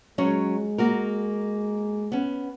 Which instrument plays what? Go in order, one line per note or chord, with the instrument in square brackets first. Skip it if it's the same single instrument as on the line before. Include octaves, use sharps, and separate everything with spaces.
[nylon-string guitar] F#3 C#4 C#5 [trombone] G#3
[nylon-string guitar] A#3 F#4 A#4
B3 C#4